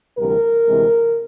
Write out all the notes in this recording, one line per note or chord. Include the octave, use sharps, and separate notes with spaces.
D2 C3 E3 G3 A#4
D2 C3 E3 G#3